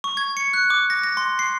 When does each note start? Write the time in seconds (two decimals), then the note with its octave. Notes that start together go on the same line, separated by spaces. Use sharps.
0.04 C#6
0.17 G#6
0.37 C#7
0.54 F#6
0.70 D6
0.90 A#6
1.03 A#6
1.17 C6
1.39 C7